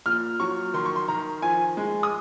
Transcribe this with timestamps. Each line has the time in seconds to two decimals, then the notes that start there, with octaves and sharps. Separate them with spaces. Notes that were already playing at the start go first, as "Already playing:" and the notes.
0.06 A#2 F6
0.40 F#3 C#6
0.74 D#3 C6
0.85 C#6
0.96 C6
1.08 D#3 A#5
1.42 F3 G#5
1.77 G#3
2.03 D#6